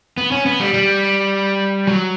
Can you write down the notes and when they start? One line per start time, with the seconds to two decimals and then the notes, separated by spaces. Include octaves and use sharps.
0.18 B3
0.32 C#4
0.46 B3
0.60 G3
0.74 G3
1.87 F#3